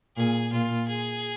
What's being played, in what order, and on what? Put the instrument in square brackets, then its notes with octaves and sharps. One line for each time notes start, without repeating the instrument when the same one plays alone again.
[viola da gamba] A#2 [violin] G#4
[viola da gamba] A#2 [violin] F4
[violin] G#4